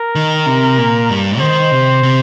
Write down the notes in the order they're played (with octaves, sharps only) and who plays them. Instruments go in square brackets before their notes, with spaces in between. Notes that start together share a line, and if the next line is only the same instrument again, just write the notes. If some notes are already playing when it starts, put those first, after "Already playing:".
Already playing: [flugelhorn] A#4
[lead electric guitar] D#3
C3
A#2
G2
[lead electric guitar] D#3 [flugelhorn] C5
[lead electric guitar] C3
C3